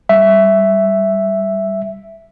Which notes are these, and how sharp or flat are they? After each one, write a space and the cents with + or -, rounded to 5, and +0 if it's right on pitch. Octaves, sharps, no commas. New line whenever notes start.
G3 -5 E5 +0